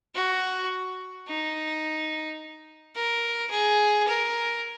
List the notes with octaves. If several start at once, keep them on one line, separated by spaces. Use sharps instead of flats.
F#4
D#4
A#4
G#4
A#4